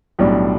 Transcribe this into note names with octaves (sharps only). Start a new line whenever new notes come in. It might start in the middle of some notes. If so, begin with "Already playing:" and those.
B1 A2 G3 D4